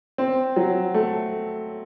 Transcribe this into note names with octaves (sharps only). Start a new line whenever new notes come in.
C4
F#3
A3